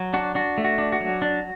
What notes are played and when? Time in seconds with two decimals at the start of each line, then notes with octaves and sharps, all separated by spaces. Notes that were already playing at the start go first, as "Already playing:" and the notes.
Already playing: F#3
0.14 D4 F#4
0.35 D4 F#4
0.58 A3
0.64 F#4
0.78 D4
0.92 F#4
1.00 F#3
1.22 D4